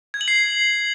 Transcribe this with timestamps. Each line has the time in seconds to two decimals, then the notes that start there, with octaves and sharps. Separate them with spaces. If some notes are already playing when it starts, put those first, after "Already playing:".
0.14 G#6
0.21 F#7
0.28 C7